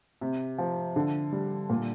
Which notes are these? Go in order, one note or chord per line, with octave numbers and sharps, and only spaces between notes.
C3
F3
D3
G3
A#2